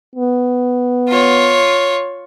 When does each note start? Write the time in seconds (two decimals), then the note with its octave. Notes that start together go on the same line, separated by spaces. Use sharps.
0.16 B3
1.09 F4 C#5